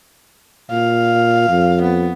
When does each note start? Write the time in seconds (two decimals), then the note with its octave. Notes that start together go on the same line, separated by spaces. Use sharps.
0.71 A#2 F5
1.50 F2
1.83 B3